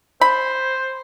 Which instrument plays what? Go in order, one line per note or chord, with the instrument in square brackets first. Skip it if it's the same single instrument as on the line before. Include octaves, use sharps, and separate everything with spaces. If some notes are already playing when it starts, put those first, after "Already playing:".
[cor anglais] C5 [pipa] B5